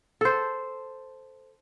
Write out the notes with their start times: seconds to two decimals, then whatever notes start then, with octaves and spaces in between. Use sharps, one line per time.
0.21 A4 C5